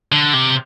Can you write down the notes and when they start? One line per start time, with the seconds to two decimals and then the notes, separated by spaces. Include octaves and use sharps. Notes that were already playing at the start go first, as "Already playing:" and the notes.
0.12 D3
0.33 C3